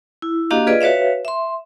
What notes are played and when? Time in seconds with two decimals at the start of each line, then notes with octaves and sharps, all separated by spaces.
0.22 E4
0.51 A#3 D4 F#4 G4 D#5 F5
0.67 F4 G#4 B4 D5 D#5
0.81 F#4 B4 C#5 E5 F5
1.25 E5 C6